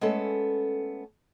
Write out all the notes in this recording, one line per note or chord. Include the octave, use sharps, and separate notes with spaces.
G#3 A3 B3 C#4 A4